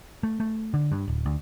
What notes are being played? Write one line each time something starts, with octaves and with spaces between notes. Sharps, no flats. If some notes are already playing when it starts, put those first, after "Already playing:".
A3
A3
D3
G2
D1
D2